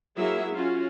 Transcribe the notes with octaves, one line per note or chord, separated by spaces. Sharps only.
F#3 A#3 E4 G#4 E5
C#4 F4 F#4